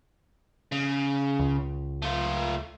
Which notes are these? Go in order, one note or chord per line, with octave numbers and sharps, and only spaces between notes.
C#3
C#2
A3 F4